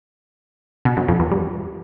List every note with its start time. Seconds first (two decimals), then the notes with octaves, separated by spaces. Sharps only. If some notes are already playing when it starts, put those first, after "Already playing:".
0.85 B2
0.97 F#2
1.08 F2
1.20 E2
1.31 G2